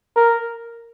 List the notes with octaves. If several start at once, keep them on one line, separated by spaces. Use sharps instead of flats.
A#4